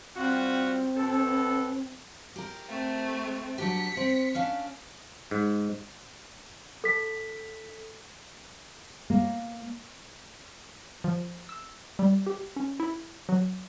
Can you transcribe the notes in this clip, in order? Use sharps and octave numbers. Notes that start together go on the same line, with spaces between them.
G3 C4 F4 F#4
B2 A4
G4 A#4
A3 C4
F#3 D4 G4 B6 C#7
C4
C#4 D4 F5
G#2
A4 B6
A#3
F3
E6
G3
G4
C#4
E4
F#3